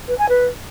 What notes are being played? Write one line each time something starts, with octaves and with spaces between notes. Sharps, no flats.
B4
G#5
B4